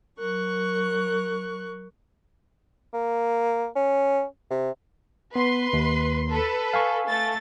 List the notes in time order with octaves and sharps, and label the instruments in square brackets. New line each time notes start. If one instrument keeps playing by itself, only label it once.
[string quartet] F#3 A#4 C#6 F#6
[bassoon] A#3
C#4
C3
[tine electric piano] B3 [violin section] B4 C6
[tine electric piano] D#2
[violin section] A4 B4
[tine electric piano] F5 G#5 C#6
[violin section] A3 A6